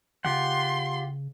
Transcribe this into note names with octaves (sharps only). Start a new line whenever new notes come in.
C#3 F4 G4 F#5 C6